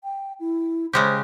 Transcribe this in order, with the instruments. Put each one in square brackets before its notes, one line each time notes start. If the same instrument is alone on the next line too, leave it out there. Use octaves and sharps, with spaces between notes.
[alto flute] G5
E4
[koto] C#3 G#3 G4 [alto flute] C5